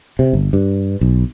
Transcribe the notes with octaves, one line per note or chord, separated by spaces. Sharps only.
C3
G1
G2
B1